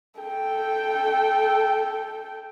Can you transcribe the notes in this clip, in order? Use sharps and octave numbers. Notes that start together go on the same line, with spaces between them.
A4 G5